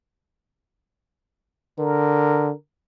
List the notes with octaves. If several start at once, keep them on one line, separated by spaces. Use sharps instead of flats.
D3 A#4